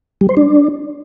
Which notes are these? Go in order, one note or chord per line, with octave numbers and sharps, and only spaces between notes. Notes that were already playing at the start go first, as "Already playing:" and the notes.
G3
C5
D4